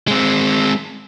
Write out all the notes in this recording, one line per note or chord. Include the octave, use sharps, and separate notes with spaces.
G#3 C4